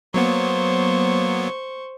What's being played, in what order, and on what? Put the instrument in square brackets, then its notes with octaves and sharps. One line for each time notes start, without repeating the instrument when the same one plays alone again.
[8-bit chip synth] F#3 A#3 B3 [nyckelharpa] C5 C#6